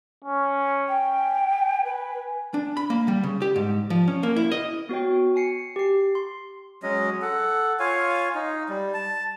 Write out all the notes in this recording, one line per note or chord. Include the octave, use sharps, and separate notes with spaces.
C#4
G5
G#5
B4
D4
B5
A#3
G3
C#3
G4
G#2
F3
C#4
A#3
E4
D#5
B3 F#4 C#5 G5
G#5 C7 C#7
G4 C7
C6
F#3 G#3 C#4 D#5
A4 F#5
F4 C#5 F5 G#5
D#4
G3
A5